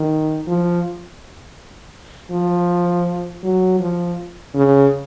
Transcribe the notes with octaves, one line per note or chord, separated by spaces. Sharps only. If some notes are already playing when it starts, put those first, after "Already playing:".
Already playing: D#3
F3
F3
F#3
F3
C#3